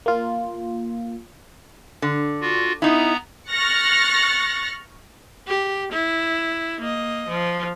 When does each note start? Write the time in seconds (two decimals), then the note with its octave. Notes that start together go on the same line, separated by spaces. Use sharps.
0.06 A#3 F4
2.02 D3
2.41 F4 F#4
2.82 B3 D#4 E4 A#5
3.49 C#6 F6 F#6 A6 A#6 C#7
5.48 G4
5.92 E4
6.80 A#3 D#5
7.28 F3